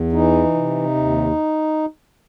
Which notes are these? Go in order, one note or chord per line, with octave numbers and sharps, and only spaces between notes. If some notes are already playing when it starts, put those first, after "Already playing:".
Already playing: E2
E3 D#4
C3
D#2